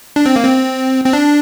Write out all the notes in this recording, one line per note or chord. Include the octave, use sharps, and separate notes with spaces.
D4
C4
A#3
C4
C4
D4